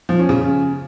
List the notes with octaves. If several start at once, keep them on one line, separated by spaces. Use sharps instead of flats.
F3
C#4
C#3